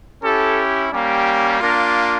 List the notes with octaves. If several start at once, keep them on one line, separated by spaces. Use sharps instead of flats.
C#4 E4 G4 A4
G3 A#3 C#4 G4
A#3 D4 F4 A#4